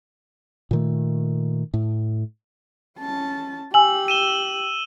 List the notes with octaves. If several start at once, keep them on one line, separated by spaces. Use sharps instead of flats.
A#2 D#3 A3
A2
C#4 A5
G4 G#5 E6 F#7
D#7 E7 G7